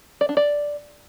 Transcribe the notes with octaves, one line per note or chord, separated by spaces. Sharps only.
D5
D4
D5